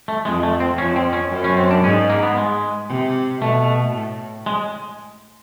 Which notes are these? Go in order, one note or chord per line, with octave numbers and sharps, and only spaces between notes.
A3
F2 G#3
A3
C4
F2 C#4
C4
C#4
F#2
C#4
C4
D4
G#2 C#4
A#3
B3
G#3
C3
B2 A3
A2
G#3